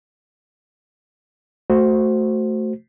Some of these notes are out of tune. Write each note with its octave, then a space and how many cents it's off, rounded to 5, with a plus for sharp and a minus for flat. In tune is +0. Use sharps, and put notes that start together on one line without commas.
A3 +0 F#4 +0 C5 +0